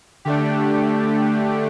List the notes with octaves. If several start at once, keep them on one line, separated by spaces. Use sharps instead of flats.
D3 A3 D4 G4